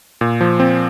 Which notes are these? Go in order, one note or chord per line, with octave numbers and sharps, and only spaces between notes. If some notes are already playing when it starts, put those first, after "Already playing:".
A#2
F3
C4